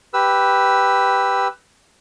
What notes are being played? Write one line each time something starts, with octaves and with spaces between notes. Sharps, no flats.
G4 B4 E6